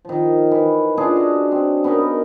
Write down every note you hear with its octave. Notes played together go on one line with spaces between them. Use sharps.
D#3 F3
E3
C#4 D4 F4 G#4
F#4
C4
B3 C#4 D#4 A#4